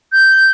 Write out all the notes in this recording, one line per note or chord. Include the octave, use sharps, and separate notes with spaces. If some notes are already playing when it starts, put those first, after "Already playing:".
G6